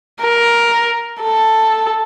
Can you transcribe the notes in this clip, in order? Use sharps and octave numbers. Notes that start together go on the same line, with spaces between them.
A#4
A4